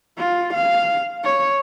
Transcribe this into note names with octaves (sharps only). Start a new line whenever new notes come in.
F4
F5
C#5